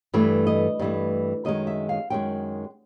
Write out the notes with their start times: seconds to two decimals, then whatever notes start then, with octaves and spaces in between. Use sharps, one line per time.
0.14 G2 E3 A3 D5
0.47 D#5
0.79 G2 E3 A3
1.45 F#2 D#3 G#3 D#5
1.67 E5
1.89 F5
2.10 F#2 D#3 G#3 G5